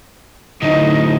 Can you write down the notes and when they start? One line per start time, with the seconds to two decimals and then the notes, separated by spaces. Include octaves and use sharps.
0.62 D2 A2 D#4 D#5